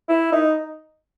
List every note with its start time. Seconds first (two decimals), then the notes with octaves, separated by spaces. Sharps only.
0.09 E4
0.32 D#4